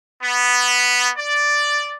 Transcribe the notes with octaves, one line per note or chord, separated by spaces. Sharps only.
B3
D5